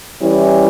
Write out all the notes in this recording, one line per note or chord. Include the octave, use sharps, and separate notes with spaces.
E3 G3 C#4 E4